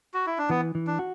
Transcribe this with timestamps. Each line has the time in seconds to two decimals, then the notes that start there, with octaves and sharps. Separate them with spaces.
0.14 F#4
0.27 E4
0.38 D4
0.50 E3 B3
0.75 E3
0.87 D4
0.99 F#4